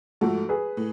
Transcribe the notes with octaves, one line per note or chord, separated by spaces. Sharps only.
G#2 F3 A3 F#4 A4
G#4 B4
A2